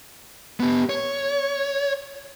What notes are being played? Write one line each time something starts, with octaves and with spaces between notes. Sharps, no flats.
B3 G4
C#5